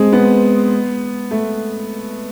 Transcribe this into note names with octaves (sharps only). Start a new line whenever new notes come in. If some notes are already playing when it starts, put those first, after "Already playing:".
Already playing: G#3 C4
B3
A3